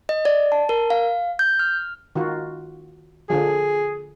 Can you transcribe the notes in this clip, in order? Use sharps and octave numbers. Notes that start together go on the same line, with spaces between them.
D#5
D5
A5
A#4
F5
G6
F6
D#3 F4 F#4
D3 F3 G#4